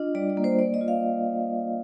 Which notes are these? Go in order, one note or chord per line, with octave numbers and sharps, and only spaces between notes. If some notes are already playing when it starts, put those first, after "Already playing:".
Already playing: D4 F4 D#5
G3 D5
D5
A#3
C5
A#3 D5
D#5
F4
F5